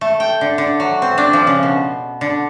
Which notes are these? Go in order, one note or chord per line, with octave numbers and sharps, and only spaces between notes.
A3
G5
D3
D3
F#3
C4
D4
F3
C#3
B2
D3